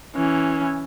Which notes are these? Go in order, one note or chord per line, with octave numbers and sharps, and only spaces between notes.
E3 C#4